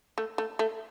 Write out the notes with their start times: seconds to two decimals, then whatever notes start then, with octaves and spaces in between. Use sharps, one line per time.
0.18 A3
0.38 A3
0.59 A3